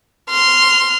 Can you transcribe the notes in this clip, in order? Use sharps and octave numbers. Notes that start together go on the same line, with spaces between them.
C6 F6